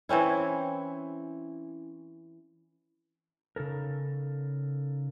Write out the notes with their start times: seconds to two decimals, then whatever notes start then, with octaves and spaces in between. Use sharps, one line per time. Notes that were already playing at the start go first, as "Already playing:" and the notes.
0.09 E3 C4 C#4 E4
3.56 C#3 D#4 A4 A#4